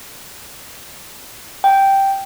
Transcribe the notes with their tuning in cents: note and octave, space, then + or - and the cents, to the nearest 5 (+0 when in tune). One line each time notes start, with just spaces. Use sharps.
G5 -5